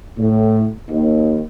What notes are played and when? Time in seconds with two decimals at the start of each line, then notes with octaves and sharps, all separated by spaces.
0.18 A2
0.89 D#2